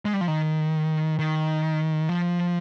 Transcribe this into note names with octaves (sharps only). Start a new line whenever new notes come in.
G#3
G3
F3
D#3
D#3
F3